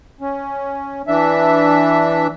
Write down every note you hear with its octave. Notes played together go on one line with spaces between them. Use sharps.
C#4
E3 D4 E5